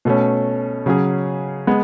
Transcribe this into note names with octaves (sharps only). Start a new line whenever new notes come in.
B2 A3 C#4
C#3 F#3 C#4 G#4
G#3 B3